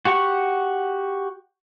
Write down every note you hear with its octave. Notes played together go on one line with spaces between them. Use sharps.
F#4 G4 F#5 C#6